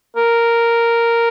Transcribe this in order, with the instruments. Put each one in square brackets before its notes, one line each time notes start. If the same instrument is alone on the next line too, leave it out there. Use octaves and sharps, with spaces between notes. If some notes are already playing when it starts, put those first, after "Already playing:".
[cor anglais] A#4